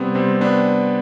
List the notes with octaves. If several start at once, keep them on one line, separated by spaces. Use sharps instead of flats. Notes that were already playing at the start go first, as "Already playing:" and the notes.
Already playing: C3 G3 B3 C4
C3 G3 C4
B3 D4